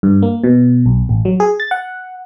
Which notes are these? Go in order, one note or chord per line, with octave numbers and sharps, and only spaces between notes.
G2
A#3
B2
B1
A1
F#3
G#4
A6
F#5